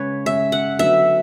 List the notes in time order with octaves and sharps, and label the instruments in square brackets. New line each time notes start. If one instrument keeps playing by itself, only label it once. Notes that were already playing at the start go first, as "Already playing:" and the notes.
Already playing: [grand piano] C#3 G#3 C#4 [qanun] B4 C#5
[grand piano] C#3 G#3 C#4 [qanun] E5
[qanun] F#5
[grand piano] D3 F#3 B3 F#4 A4 [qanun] E5